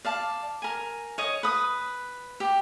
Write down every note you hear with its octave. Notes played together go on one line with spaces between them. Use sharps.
D5 F5 A5
A#4 G#5
C#5 D#5 D#6
B4 D#6
G4